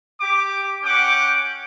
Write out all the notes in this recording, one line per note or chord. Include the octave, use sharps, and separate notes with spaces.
G4 D6
C#4 F#5 G5 D6